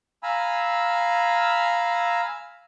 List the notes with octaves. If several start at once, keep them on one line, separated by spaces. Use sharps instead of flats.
F5 G#5 A#5 B5 E6